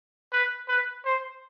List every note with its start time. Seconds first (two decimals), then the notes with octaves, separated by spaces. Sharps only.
0.32 B4
0.68 B4
1.05 C5